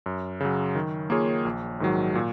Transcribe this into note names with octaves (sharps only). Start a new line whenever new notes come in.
F#2
C#3 F#3
D#3
A#3 F4 G#4 C#5
A#1
G#2 D#3 F#3
A#2